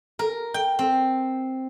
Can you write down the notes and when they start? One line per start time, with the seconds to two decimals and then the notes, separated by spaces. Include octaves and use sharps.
0.19 A#4
0.54 G5
0.79 C4